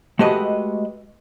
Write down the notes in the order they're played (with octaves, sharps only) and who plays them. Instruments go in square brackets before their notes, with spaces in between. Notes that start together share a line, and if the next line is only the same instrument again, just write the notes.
[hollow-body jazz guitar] G#3 A3 F#4 G4 B4 D#5